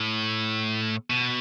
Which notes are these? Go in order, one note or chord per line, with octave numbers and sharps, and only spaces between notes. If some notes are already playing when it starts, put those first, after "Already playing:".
Already playing: A2
B2